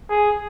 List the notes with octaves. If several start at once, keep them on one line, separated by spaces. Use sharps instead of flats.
G#4